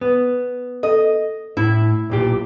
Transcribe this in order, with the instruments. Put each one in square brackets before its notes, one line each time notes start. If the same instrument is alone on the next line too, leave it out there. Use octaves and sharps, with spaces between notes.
[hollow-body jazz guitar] B3
[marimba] A4 [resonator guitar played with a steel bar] D#5
[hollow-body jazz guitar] A2 [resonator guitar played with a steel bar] E4
[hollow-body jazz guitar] B1 A#2 G4